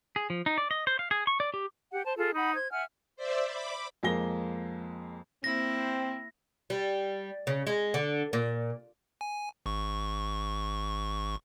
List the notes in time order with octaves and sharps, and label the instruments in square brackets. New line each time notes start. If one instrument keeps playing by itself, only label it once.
[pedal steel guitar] G#4
F3
D#4
D5
D#5
C5
F5
G#4
C#6
D5
G4
[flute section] G4 F#5
C5 A5
F4 G#4 A4
D#4 F#5 B5
C5 G#6
E5 F#5 G#5 F6
[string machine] C5 D5 E5
B5 D6
[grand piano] F2 G#3 A#3 G#4 A#6 G7
[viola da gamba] A#3 E4 [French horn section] C4 [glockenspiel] A#6
[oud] G3
C#3
G#3
D3
A#2
[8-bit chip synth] G#5
G#1 C#6